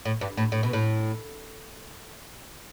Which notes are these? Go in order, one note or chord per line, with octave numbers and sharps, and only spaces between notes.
A2
G2
A2
A2
B2
A2